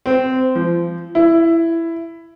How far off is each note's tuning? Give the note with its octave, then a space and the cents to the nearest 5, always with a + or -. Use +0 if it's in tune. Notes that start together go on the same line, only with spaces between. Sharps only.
C4 -15
F3 -30
E4 +10